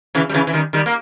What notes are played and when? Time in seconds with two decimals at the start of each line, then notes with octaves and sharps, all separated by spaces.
0.15 C#3 E3
0.30 G3
0.34 C#3 E3
0.47 E3
0.53 D#3 G3
0.73 D#3 G3
0.86 A#3